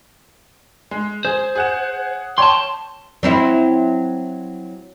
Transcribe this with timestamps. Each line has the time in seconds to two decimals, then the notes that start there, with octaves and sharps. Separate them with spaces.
0.91 G#3
1.25 G#4 C5
1.55 G#4 F#5 E7
2.38 C#5 G5 A5 C6
3.23 F#3 C4 E4